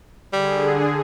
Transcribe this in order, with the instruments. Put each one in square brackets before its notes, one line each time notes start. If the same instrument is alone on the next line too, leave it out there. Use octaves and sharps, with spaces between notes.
[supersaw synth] D3 G#4 [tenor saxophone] G3